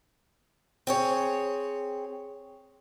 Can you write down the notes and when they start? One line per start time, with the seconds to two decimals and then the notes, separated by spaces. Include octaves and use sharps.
0.87 C4 G#4 C#5